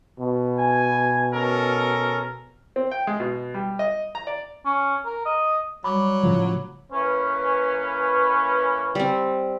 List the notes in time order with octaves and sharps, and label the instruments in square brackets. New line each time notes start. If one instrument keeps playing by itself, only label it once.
[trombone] B2
[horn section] G#5
C#4 A4 A#4
[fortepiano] C4
G5
G#3
B2
G3
D#5
A#5
D5
[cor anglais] C#4
A#4
D#5
[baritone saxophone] F#3 [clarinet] G3 [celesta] B5 D6
[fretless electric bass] A2 C#3 F3
[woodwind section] E3 A#3 C#4 [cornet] B4
[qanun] G3 C4